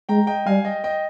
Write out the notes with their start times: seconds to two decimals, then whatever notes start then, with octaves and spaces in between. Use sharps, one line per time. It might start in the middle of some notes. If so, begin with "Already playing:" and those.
0.09 G#3 G5 A#5
0.27 D#5 G5
0.46 G3 F5 G#5
0.65 D#5 G5
0.84 D#5 G5